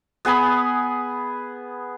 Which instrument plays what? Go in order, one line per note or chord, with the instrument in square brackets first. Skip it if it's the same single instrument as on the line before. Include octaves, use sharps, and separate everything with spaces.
[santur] B3 G#4 G#5 B5